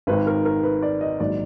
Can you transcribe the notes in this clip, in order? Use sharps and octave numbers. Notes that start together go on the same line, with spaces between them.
G#1 G#2 D#3 B4
A#4
A#4
B4
D5
D#5
A#1 G#2 D#3 F#3 D5